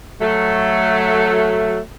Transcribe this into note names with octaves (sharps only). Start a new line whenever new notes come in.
F#3 A3